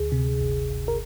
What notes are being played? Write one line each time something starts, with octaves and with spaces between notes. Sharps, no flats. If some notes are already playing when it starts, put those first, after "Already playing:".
Already playing: D2 G#4
C3
G1
G1
A#4